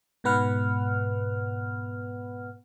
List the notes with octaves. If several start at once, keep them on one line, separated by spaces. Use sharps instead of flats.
G#2 B2 B3 B4 F#5 F6